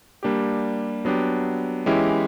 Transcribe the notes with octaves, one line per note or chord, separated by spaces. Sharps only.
G3 A#3 D4 G4
F#3 B3 D4 G4
E3 G#3 C#4 E4 G4